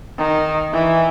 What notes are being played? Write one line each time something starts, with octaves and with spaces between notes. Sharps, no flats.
D#3
E3